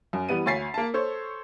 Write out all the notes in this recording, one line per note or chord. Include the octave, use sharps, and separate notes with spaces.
F#2
E3 G3 B3 D#7
D2 C#5 G#5 A6 B6 C7
A#3 A5
A4 C5 C#5